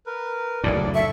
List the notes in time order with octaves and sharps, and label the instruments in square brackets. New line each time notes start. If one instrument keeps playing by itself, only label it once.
[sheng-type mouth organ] A#4 B4
[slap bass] F#1 D2 A2 [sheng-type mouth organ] D4 D5
[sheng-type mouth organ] A4 C#6 [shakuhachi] E5